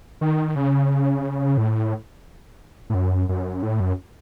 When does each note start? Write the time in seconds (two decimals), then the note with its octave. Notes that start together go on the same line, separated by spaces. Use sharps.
0.21 D#3
0.56 C#3
1.58 A2
2.90 A2
2.94 F#2
3.29 F#2
3.63 A2
3.80 F#2